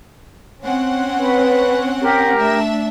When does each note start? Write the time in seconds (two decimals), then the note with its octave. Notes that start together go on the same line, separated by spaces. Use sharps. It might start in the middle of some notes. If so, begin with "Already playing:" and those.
0.65 C4 C#4 F#5
1.19 B4
2.00 G4 A#4
2.38 A3 D4 E5